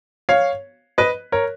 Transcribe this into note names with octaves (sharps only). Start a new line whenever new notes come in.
C#5 F5
B4 D#5
A#4 C#5